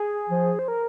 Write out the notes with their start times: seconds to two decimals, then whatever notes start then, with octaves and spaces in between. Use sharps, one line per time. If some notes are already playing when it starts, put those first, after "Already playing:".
Already playing: G#4
0.29 F3
0.59 C5
0.68 A#4